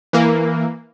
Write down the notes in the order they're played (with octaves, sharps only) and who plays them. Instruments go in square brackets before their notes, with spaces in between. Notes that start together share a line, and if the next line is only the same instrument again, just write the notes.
[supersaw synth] E3 A#3